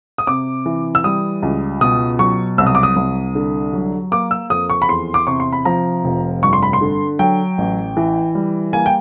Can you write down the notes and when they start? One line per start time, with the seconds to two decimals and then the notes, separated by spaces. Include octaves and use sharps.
0.18 D#6
0.27 C3 D6
0.66 E3
0.95 E6
1.04 G3 D#6
1.42 C#2
1.81 B2 D#6
2.19 F#3 C#6
2.58 C2 E6
2.66 D#6
2.75 D6
2.83 D#6
2.96 C2
3.35 D3
3.73 F#3
4.12 A#3 D6
4.31 E6
4.50 F2 D#6
4.70 C#6
4.82 B5
4.89 E2 C6
5.14 D6
5.27 C3 C#6
5.40 C6
5.53 B5
5.65 F3 A#5
6.04 F1
6.42 G2 C#6
6.53 C6
6.63 B5
6.73 C6
6.81 D3
7.19 F#3 G5
7.58 A1
7.97 E3
8.35 G3
8.73 A#3 G#5
8.86 G5